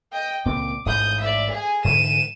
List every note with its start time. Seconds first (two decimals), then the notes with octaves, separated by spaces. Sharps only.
0.12 D#5 G5
0.45 C#2 A#2 C4 D6
0.86 A1 G#2 D#6 G6
1.20 D5 E5
1.50 G#4 G#5
1.84 G#2 D3 E3 D#7 E7